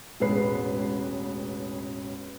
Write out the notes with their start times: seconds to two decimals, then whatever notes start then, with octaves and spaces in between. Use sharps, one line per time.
0.20 E1 A1 G#3 B4 C7